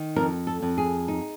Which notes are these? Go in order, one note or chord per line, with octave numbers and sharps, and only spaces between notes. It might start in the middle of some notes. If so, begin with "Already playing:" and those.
Already playing: D#3
F2 A#4
A4
F2
G#4
D#4